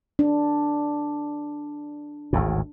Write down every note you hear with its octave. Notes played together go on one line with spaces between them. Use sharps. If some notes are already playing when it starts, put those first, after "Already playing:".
D4
G#1 D2 A2